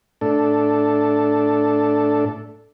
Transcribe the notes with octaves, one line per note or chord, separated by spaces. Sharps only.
A2 D4 A4